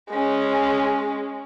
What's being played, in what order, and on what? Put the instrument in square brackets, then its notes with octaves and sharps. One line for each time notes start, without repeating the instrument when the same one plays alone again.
[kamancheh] G#3 C#4